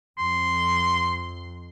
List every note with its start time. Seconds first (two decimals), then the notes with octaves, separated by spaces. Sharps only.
0.18 F2 C6